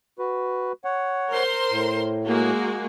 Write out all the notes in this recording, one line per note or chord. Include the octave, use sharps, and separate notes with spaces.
F#4 B4
C#5 F#5
A#4 C5 C6
A2
G#3 A#3 F#4